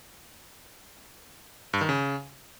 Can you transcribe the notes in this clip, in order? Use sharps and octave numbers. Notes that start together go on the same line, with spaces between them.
G2
D#3
C#3